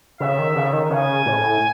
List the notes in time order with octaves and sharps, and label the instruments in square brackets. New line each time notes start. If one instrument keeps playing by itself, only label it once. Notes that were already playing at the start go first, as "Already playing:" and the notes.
[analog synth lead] C#3 [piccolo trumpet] E5
[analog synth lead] D#3
C#3
D#3
[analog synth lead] C#3 [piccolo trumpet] G#5
[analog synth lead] A2